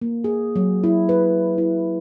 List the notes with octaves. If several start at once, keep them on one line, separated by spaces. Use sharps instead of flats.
A#3
G#4
F#3
E4
B4
E4